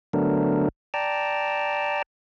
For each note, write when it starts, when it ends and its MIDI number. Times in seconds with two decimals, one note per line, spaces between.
0.13 0.69 50
0.13 0.69 54
0.13 0.69 57
0.13 0.69 59
0.13 0.69 62
0.13 0.69 70
0.94 2.02 74
0.94 2.02 79
0.94 2.02 81
0.94 2.02 82